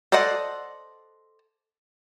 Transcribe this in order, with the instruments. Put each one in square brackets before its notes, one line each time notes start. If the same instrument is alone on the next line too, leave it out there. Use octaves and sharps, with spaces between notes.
[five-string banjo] A4 C5 D5 D#5 F#5